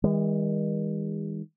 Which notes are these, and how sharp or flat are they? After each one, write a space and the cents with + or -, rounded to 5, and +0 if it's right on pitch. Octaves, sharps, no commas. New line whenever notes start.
D#3 +40 G#3 -40